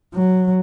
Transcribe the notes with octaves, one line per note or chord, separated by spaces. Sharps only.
F#3